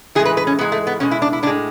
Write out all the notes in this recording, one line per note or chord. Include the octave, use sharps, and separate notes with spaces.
A2 E3 G#3 G#4
B4
B4
C#4
G#2 E3 G#3 B3
A3
B3
E2 B2 G#3 C#4
E4
D4
E4
A2 G#3 D4